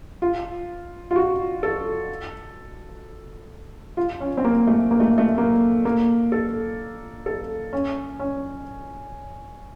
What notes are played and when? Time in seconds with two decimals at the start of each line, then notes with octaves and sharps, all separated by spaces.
0.22 F4
1.11 F4
1.16 F#4
1.63 A4
3.97 F4
4.20 C#4
4.37 C4
4.45 A#3
4.67 A3
4.91 A#3
5.00 A3
5.18 A3
5.38 A#3
5.85 A#3
6.32 A4
7.26 A4
7.73 C#4
8.19 C#4